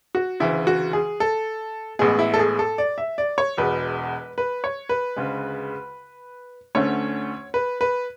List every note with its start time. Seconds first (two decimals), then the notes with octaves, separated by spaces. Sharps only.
0.15 F#4
0.40 D2 C#3 E3 E4
0.67 F#4
0.93 G#4
1.20 A4
1.99 A1 A2 G#3 B3 G#4
2.19 E4
2.34 A4
2.39 G#4
2.59 A4
2.78 D5
2.98 E5
3.18 D5
3.38 C#5
3.57 E1 E2 B2 B4
4.38 B4
4.64 C#5
4.89 B4
5.16 D2 C#3 G#3
6.75 D2 D3 A3 C#4 C#5
7.54 B4
7.81 B4